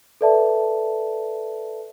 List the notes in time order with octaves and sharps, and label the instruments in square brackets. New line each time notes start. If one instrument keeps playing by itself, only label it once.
[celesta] A4 B4 D5 E5 A5